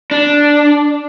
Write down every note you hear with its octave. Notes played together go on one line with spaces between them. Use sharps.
D4